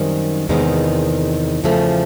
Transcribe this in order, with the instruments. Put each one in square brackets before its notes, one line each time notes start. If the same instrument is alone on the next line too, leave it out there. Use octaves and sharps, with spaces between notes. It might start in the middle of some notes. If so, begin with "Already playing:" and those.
Already playing: [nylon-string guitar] F#2 D#3 G3 C4
E2 C3 D#3 G#3 B3
E2 C#3 F3 A3